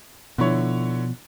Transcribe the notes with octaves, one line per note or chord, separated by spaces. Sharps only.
B2 D3 F3 E4 C#5